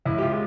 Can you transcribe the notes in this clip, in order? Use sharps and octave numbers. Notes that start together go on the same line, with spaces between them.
C#2 E4
G4
F4
G#3